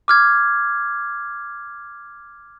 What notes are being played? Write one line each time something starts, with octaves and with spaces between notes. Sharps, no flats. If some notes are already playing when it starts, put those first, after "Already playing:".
D6 F6 G#6